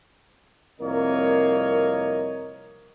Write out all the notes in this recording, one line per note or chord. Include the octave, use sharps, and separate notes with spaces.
C2 F2 A#3 A#4 C#5 D#5